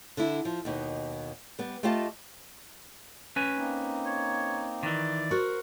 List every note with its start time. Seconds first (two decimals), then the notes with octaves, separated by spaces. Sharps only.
0.17 D3 E4
0.45 F3
0.65 D#2 B2 D#4
1.59 G3 B3
1.83 A3 F4 G4 D#5 F5 A5
3.36 C#4 B4 G#5
3.55 A#3 C4 D#4
4.06 C#5
4.83 D#3 E3 D5
5.31 F#4 A#4 C5